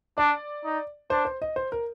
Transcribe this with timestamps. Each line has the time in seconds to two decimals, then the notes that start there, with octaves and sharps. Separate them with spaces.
0.18 D4 D5
0.64 D#4
1.10 D4 C5
1.25 C5
1.42 D#5
1.56 C5
1.72 A#4